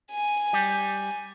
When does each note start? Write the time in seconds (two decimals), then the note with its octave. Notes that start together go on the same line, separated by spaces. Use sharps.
0.11 G#5
0.53 G3 G4